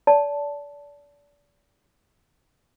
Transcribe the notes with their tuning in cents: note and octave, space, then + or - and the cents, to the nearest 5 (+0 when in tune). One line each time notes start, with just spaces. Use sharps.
D5 -30 A5 +0